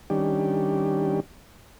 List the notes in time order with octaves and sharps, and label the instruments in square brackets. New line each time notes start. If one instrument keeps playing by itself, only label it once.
[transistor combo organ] D#3 G3 C#4 D4 G4